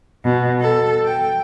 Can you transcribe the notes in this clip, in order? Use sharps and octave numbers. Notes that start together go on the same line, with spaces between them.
B2
A4
G5